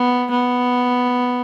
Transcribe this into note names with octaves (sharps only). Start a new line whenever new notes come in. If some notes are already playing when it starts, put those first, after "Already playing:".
Already playing: B3
B3